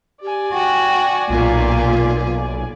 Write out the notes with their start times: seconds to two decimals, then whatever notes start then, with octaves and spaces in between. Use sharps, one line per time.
0.22 G4 D5 G#5
0.53 F#4 G5
1.30 B1 A#2 F4